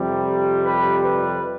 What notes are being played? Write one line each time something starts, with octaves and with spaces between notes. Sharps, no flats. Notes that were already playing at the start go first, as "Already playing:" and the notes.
Already playing: F2 C3 G3
B4
B4